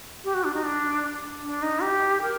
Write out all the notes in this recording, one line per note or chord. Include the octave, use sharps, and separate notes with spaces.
G4
F#4
D4
D#4
D4
D4
D#4
G4
A#4